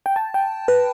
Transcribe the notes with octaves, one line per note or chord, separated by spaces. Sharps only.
G5
A5
G5
B4